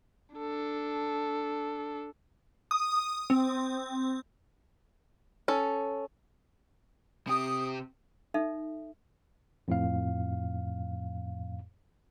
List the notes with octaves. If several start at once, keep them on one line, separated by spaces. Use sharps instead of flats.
D4 A4
D#6
C4
C#4 A4
C3 G4 D#6
D#4 A4 E5
F2 A2 F5